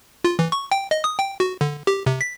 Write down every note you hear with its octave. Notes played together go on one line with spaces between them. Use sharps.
F4
E3
C#6
G5
D#5
D#6
G5
F#4
D3
G4
C3
B6